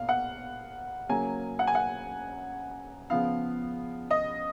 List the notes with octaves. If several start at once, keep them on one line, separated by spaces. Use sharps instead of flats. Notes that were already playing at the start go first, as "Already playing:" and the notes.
Already playing: A#2 B3 F5
F#5
C#3 F#3 A#3 G#5
F#5
G#5
F#5
C#3 F3 B3 F5
D#5